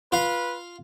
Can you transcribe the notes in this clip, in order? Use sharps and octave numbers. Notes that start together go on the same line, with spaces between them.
F4 B4 F5